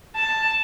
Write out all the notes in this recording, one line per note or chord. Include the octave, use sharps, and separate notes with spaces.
A5